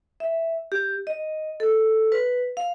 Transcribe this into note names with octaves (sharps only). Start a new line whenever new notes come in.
E5
G4
D#5
A4
B4
F5